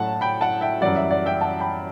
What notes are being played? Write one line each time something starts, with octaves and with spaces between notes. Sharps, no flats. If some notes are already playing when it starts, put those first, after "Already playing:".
Already playing: A2 F#3 A3 F#5 A5
G5 B5
F#5 A5
E5 G5
F#2 E3 G3 D5 F#5
E5
D5 F#5
E5 G5
F#5 A5
G5 B5